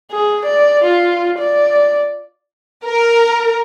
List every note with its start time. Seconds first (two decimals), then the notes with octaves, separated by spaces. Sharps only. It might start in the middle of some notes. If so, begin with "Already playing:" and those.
0.12 G#4
0.46 D5
0.84 F4
1.39 D5
2.84 A#4